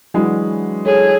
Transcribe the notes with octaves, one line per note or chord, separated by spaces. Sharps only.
E3 F#3 G#3 D4 F#4
G#4 A4 C#5